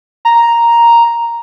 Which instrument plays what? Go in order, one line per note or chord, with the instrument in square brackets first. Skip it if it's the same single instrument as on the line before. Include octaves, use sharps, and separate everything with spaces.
[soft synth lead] A#5